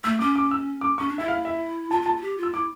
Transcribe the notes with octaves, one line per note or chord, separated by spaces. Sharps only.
A3 E6
C#4 D6
D6
E6
D6
C#4 C#6
D4
E4 E5
F5
E5
F4 A5
F4 A5
F4
G4
F4
E6
E4 D6